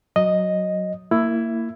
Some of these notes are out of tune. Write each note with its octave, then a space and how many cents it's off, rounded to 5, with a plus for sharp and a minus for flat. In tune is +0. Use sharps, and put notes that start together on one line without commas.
F#3 +0 D#5 +0
A#3 -20 E4 +10